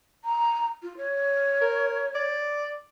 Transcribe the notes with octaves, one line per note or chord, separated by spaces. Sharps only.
A#5
F4
C#5
A#4
D5